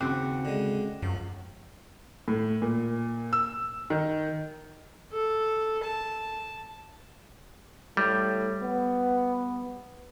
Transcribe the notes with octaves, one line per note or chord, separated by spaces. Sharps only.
D#2 C#3 C4 F#4 G5 D6 F#6
D3 G#3
F#2 F3
A2
A#2
E6
D#3
A4
A5
A2 G3
B3